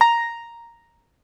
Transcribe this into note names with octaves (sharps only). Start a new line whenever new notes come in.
A#5